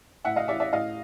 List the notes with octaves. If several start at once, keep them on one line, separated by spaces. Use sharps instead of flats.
A2 E5 F#5
D#5 F5
E3 D5 E5
D5 E5
A2 D#5 F5